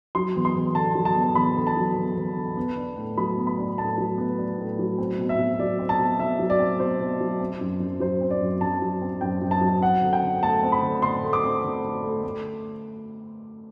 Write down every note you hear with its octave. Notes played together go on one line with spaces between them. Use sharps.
F#3 C6
E2
C6
E2
D3 A5
F#3
A5
E2
E2 B5
D3
A5
F#3
E2
E2
D3
B3
D4
A2
F#3 B5
B3
B5
D4
A2 A5
F#3
B3
D4
A2
F#3
C4
B2
E5
B2
F#3 D5
C4
A5
B2
B2 E5
F#3
D5
C4
B2 C5
B2
F#3
C4
F#2
F#2
F#3 C5
C4
D5
F#2
F#2 A5
F#3
C4
F#2 G5
F#2
A5
F#3
C4 F#5
D3
G5
D3
A3 A5
C4
B5
D3
D3 C6
A3
D6
C4
D3
D3
A3
A3